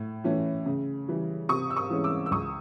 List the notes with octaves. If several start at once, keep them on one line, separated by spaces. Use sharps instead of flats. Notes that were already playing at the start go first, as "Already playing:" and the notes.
Already playing: A2
E3 A3 C#4
C#3
E3 G3
C3 C#6 D#6
E6
C#6 D#6
E3 G#3 C#4
D6 E6
E6
C#2 C#6 D#6